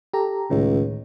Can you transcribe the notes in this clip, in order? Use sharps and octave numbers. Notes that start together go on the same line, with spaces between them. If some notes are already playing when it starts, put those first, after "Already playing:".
G4 A4 A#5
C#2 A2 D#3